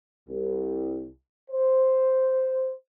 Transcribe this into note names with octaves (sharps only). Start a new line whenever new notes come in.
C2
C5